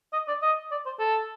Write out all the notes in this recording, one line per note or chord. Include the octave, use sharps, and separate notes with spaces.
D#5
D5
D#5
D5
C5
A4